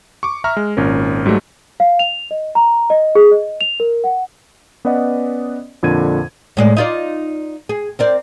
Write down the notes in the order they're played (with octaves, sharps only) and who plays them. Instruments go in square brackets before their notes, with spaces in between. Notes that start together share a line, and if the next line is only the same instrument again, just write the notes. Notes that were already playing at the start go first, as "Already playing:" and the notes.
[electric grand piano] C#6 D6
E5 A#5 C#6 F6
G#3
G#1 A#2 C#4 A#4
G#2 F#3 G3 A3
[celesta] F5
F7
D#5
A#5
D#5
G#4
D#5
F7
A#4
F#5
[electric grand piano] B3 C#4 B4 D5 D#5 F#5
F2 A#2 D3 G#6 D#7
[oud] A2 G#3 D5
D#4 F4 D5
G#4
C4 A#4 D5